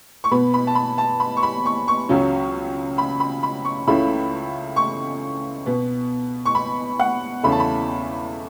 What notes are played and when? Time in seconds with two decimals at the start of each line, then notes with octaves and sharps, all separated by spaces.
0.24 C#6
0.31 B2 B3 B5
0.54 B5
0.67 A5
0.75 B5
0.98 A5
1.20 B5
1.37 C#6
1.43 B5
1.66 C#6
1.88 C#6
2.09 C#2 C#3 F#3 C#4
2.98 B5
3.20 B5
3.43 B5
3.65 C#6
3.87 C#2 C#3 E3 A3 B5
4.76 C#6
5.66 B2 B3
6.46 C#6
6.55 B5
6.99 F#5
7.43 E2 C#3 A3 B5
7.52 A5
7.60 B5